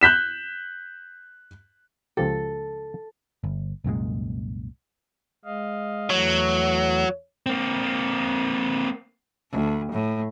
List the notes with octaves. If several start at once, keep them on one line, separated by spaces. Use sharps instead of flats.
F#6 G6 B6 E7
C#2 F3 G4 A4
G1
C2 F#2 A#2 G#3
G#3 D#5 F5
E2 E3 F#3 A3
A#3 C4
D2
A2